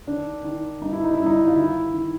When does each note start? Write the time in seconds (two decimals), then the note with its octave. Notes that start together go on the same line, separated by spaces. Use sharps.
0.07 D#3 D4
0.44 D#3
0.81 G2 D#4
0.93 E4
1.04 D#4
1.15 G2 E4
1.26 D#4
1.47 F4
1.55 D#3 E4
1.93 D#3